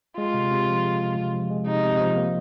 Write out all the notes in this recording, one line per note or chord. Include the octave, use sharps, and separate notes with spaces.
G#3 F4
C3
C3
F3
G#3
C3
C3
F3
G#3
C3 D#4
C3
F3
A#3